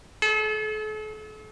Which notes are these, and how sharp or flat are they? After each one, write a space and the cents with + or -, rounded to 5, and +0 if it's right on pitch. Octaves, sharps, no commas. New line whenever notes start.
A4 -40